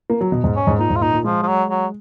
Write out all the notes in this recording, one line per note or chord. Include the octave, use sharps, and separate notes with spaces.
A#3
F#3
B2
G#2
C#4
G#2
A#2 D#4
G#2
F4
A#2 D#4
A#2
F3 G#3
F3
F#3
F#3